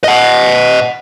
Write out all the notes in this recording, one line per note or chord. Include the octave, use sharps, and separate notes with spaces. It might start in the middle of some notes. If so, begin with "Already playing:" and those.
D#5 F#5